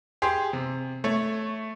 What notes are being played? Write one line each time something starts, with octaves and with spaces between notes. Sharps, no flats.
G4 G#4 C6
C3
A3 C#5